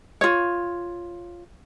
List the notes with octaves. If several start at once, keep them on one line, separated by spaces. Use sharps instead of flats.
F4 C#5